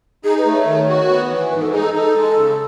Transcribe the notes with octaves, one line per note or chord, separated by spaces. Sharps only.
D#4 G#4
B4
A3
C#5
D#3
F#4
B3
E3
G#2 B4
A4
D#4 G#4
A4
D#4 A4
G#3
C#3